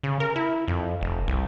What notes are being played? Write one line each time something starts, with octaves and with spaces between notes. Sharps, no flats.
C#3
A#4
E4
F2
F1
C2